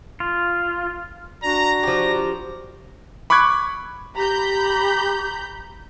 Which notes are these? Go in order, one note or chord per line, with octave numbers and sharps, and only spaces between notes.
F4
D4 F#4 A#5 A#6
F3 G4 A#5
B5 C#6 D6 F#6 G#6
G4 A#5 B5 G6